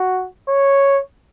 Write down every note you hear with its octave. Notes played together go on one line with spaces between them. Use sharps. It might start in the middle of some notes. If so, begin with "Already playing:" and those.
Already playing: F#4
C#5